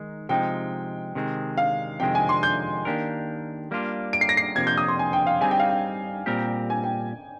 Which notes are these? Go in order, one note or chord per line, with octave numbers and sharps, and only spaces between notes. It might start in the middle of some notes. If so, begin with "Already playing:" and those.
Already playing: D#3 G#3 D#4
C3 F3 G#3 D#4 G5
C3 D#3 G#3 C4
F5
F2 C3 D#3 G#3 C4 G5
G#5
C6
G6
D#3 A#3 D4 G4 A#4
G3 A#3 D4 F4
D7
C7
A#6
C7
F2 C3 F3 A#3 G#6
G6
D#6
C6
G#5
G5
F5
G3 C4 D#4 G#4 G#5
G5
F5
G5
A#2 G3 C4 G4 A#4
G#5
G5